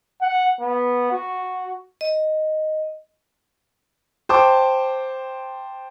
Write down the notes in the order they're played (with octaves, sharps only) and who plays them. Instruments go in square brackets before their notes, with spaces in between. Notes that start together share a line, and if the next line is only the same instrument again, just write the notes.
[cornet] F#5
B3
F#4
[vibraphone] D#5
[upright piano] C5 G5 A5 D6